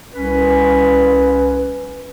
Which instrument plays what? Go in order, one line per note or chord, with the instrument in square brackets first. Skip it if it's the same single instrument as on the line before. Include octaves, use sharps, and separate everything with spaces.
[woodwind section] C2 C#4 B4